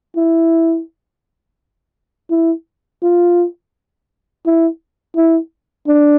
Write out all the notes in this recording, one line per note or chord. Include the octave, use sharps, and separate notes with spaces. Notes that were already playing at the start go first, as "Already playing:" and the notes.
E4
E4
F4
E4
E4
D4